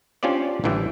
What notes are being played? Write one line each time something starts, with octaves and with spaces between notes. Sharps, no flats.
C#4 D4 F4 G4 C5 D5
A1 D3 E3 G3 A3